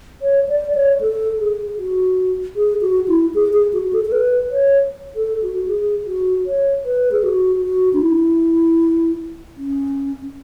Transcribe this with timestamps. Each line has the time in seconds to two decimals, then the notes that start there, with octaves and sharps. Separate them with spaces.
0.22 C#5
0.49 D5
0.75 C#5
1.01 A4
1.39 G#4
1.78 F#4
2.56 G#4
2.81 F#4
3.08 E4
3.34 G#4
3.53 G#4
3.73 F#4
3.93 A4
4.05 A4
4.12 B4
4.51 C#5
5.16 A4
5.42 F#4
5.67 G#4
6.06 F#4
6.46 C#5
6.85 B4
7.12 G#4
7.23 F#4
7.62 F#4
7.93 D4
8.02 E4
9.57 C#4